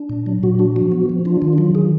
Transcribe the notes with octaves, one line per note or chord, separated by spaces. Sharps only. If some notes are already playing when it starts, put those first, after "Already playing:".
Already playing: D4
A#2
F#3
A#2 F#4
D4 F#4
F3
B3
F3
D4 F4
D#3 F4
F#3 F4
D#3 G#4